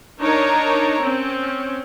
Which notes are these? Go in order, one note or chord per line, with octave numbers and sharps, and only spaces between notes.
D4 D#4 A#4 C#5 A#5
C4 C#4